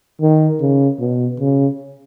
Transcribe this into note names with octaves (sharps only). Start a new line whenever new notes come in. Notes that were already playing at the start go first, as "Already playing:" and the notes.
D#3
C#3
B2
C#3